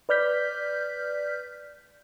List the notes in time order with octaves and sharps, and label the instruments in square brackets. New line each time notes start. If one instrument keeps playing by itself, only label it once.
[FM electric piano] B4 D5 F6 G6 B6